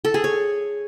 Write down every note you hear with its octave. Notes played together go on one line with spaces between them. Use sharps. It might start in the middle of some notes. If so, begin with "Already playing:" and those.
A4
G#4
C#5